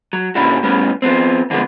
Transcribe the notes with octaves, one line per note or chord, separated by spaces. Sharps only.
F#3
A#2 D3 C#4 D4 E4 F#4
A2 G3 B3 C#4
F3 B3 C4
F2 D3 F3 G#3 B3